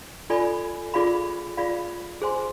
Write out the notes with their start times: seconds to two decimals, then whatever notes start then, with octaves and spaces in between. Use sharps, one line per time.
0.30 F4 A4 D5 G#5 B5
0.94 F4 G#4 D5 F5 B5
1.57 F4 G#4 D5 F5 B5
2.22 G#4 C5 G#5 C6